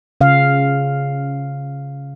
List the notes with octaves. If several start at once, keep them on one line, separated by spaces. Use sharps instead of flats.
C#3 F5